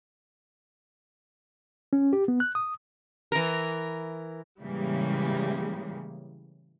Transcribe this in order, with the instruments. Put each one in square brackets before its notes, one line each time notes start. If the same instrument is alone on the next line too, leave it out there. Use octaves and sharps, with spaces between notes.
[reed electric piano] C#4
G4
B3
F#6
D#6
[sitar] E3 A#4
[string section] A2 C#3 E3 G3 G#3 A#3